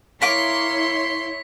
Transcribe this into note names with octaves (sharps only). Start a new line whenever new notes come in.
E4 A#4 C#5 F5 C6 D6 B6